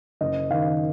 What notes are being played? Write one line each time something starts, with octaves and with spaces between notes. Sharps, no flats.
F#1 D#5
D#3 F5